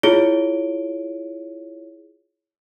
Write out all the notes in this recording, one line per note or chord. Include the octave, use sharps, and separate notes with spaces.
E4 F4 G#4 C#5 D7 G7